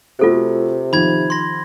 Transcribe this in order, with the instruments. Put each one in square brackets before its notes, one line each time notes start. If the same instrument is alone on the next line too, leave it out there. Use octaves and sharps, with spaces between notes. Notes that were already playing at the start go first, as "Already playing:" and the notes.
[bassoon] C3 [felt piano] A3 F#4 [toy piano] F4 A4 C5
[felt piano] D#3 F3 [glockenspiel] B5 G#6
[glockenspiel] C6 A#6